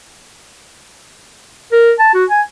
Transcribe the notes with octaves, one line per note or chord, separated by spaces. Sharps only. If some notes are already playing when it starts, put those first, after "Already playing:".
A#4
A5
F#4
G#5